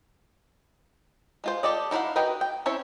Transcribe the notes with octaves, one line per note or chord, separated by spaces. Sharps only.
G#3 F4 C5
G4 A4 D5 D#5
D#4 E4 C5 F5 F#5
F#4 A#4 B4 D#5 G5
G5
C4 C#4 E4 C#5 E5